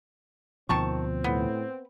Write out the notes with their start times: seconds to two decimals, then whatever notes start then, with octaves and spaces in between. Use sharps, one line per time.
0.69 D2 B2 D#3 F3 C4 A5 C#6
1.24 A2 B3